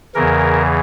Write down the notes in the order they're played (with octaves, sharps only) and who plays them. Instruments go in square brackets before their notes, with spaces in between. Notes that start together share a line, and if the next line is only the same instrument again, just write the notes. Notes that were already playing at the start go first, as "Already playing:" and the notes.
[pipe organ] E2 C#3 E3 A#4